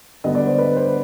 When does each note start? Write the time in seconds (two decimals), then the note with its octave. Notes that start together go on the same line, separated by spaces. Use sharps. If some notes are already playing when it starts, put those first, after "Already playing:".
0.24 D3 G3 B3 D#5
0.35 D5
0.47 C5
0.58 B4
0.77 C5